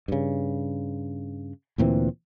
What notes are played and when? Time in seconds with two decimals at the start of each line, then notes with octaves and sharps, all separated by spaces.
0.08 G2 C#3
1.78 D2 A#2 E3 C4